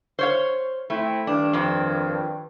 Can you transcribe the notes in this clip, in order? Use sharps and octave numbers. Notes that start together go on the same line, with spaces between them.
C5 C#5 F5
A3 C4 E4
G2 D#3 D4
F2 C4